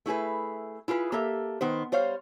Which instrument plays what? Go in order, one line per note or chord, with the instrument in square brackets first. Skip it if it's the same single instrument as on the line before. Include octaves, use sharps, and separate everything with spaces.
[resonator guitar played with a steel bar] A3 E4 G#4 B4
E4 F4 G#4 B4
A#3 G4 A4 E5
D#3 B3 C5
G3 C5 C#5 F5